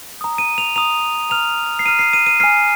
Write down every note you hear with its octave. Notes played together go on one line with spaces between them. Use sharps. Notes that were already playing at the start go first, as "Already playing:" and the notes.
A#5 D#6
D#7
F7
A#5 D#6 F7
A#5 F6 F7
C7
A#5 F6 D#7
C7
D#7
D#7
G#5 F6 C7